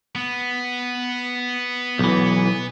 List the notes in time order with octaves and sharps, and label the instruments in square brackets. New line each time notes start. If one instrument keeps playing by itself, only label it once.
[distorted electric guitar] B3
[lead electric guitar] B1 E3